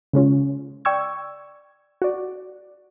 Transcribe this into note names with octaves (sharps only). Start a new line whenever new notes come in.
C#3 G#3 C#4 F4
D5 G5 C#6 E6 G#6
F#4 D5